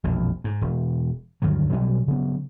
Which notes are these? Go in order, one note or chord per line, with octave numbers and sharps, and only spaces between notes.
E1 A#1 F2
G#2
E1
D2 G2 D#3 F#3
B2 F#3 G3 C#4
C#3 F#3 B3